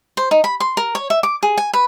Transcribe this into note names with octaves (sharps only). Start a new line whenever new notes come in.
C5
D#4
B5
C6
A#4
C#5
E5
D6
G#4
G#5
B4